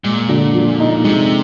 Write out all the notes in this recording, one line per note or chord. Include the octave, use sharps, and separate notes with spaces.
A#2 G#3
D3
F3
D#4
C3 G#3